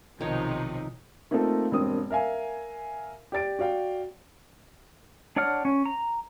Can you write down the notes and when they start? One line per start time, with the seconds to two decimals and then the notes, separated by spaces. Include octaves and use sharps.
0.21 B1 C3 D#3 F3 D#4 C#5
1.31 A3 A#3 C4 D#4 F4 A4
1.71 E1 G2 A#3 C4 D#6
2.10 A#4 E5 F5 G#5
3.32 G4 D5 A6 D7
3.59 F#4 D5 F5 G5
5.36 D4 C#5 D5 F#5 F6
5.65 C#4
5.86 A#5